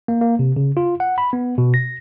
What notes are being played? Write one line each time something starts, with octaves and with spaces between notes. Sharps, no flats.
A#3
A#3
C3
C#3
F4
F#5
B5
B3
B2
A#6